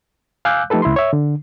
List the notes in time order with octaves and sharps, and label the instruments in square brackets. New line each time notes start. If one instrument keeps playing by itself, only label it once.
[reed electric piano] F5 G#5 D6 E6 F#6 G6
F3 A3 D#4 G4 A4 B4
C#2 E4 B5 C6
C#5 E5
D3